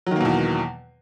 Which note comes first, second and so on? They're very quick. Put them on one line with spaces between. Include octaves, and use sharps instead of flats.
F#3 D#3 A#3 B2 E2